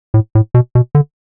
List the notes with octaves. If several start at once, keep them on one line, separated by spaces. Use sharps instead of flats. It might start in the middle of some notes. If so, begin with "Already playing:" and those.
A2
A2
B2
B2
D3